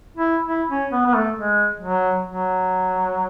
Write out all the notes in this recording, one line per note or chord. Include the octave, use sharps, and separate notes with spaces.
E4
E4
C#4
B3
B3
A3
G#3
F#3
F#3